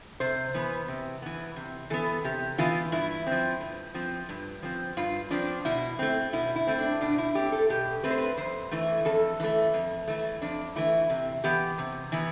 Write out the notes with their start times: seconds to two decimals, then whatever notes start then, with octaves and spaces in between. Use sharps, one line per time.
0.20 C3 C5
0.54 E3 B3
0.88 C3
1.22 E3 B3
1.56 C3
1.90 E3 B3 A4
2.24 C3 G4
2.58 E3 B3 F4
2.92 G2 E4
3.27 F3 C4
3.60 G2
3.94 F3 C4
4.29 G2
4.63 F3 C4
4.97 G2 F4
5.31 F3 C4 D4
5.65 B2 E4
5.99 A3 C4
6.33 B2 E4
6.55 E4
6.67 A3 C4
6.79 D4
7.01 B2 D4
7.18 E4
7.35 A3 C4 G4
7.52 A4
7.69 B2 G4
8.03 A3 C4 B4
8.11 C5
8.18 B4
8.38 F2 C5
8.71 E3 A3
9.05 F2 A4
9.40 E3 A3
9.74 F2
10.08 E3 A3
10.42 F2 D4
10.76 E3 A3 E4
11.10 C3
11.44 E3 B3 G4
11.78 C3
12.12 E3 B3